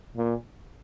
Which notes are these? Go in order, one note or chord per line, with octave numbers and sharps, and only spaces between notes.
A#2